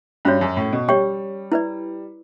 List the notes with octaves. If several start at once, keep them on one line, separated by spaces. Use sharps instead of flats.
G2 C#4 F#4 C#5
F#2
A2
B2
G3 G4 C#5 G5 C#6
E4 B4 D5